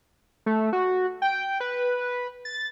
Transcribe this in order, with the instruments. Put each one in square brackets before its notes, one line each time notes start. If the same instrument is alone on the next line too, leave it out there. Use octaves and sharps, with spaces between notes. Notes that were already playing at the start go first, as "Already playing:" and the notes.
[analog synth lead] A3
F#4
G5
B4
A6